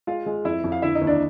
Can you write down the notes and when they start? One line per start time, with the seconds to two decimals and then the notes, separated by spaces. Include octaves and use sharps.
0.07 G#3 F4 F5
0.26 G#3
0.45 F2 E4 E5
0.64 F2
0.72 F5
0.82 D3 E4 E5
0.95 D#4 D#5
1.01 D#2
1.07 D4 D5